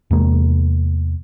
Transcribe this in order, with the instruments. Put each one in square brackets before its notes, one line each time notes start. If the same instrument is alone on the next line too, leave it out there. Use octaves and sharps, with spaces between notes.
[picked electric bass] E2 C3 G#3 A#3